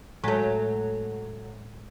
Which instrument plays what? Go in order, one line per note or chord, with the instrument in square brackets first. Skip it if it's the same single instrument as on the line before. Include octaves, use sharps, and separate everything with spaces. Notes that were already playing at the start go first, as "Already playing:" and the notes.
[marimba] A2 G#3 [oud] F#3 A3